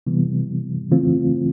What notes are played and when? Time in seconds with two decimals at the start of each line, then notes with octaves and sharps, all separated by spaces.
0.07 C3 E3 G3 B3
0.91 C#3 E3 A3 C4 F4